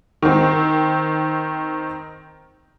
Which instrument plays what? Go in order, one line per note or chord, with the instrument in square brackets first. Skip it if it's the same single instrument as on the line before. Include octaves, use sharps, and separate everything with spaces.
[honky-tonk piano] D#3 C4